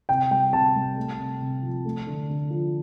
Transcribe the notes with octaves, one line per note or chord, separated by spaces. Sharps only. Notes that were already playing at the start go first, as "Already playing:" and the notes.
C3 G5
G3 G5
C3 A5
G3
A3
C3
C3
F3
A3
D3
D3
F3